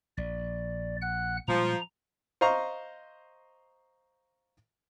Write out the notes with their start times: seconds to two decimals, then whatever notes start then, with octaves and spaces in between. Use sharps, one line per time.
0.18 A#1 D5
1.02 F#5 F#6
1.48 A#2 F3 G3 G#3 A#5
2.41 C5 D#5 F5 A#5 C#6